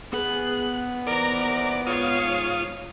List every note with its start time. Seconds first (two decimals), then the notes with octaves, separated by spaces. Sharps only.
0.13 B3 G#4 F#6
1.07 D#2 E3 A#4 C5 D5 A#5
1.87 G#2 F4 C#5 F5 D#6